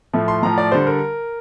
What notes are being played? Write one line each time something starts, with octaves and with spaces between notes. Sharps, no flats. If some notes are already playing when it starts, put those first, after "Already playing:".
A2 F3 A3
C6
A2 F3 A3 A#5
D5
D3 G3 C5
A#4